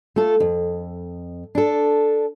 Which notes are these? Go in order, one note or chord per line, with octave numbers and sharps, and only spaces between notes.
A3 F4 A4
F2
D4 A4